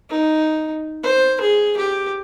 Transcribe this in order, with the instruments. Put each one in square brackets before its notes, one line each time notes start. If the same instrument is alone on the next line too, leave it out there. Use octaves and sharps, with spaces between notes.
[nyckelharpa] D#4
C5
G#4
G4